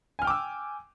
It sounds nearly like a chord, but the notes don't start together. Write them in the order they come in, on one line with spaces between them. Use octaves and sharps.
G#5 F6 G5 D6 E6